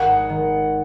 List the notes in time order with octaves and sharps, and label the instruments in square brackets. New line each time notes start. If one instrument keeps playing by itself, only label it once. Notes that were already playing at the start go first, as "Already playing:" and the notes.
Already playing: [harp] G#1 [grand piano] F#5
[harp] G#3
D#3